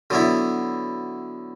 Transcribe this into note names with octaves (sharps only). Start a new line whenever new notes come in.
D3 F#3 B3 E4